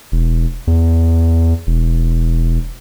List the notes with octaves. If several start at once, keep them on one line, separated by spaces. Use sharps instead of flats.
E1
E2
E1